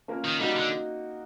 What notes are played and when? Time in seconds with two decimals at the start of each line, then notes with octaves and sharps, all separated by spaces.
0.08 A#3 C#4 F4 A#4
0.24 D#3
0.40 G3 A#3 D#4 F#4
0.56 D3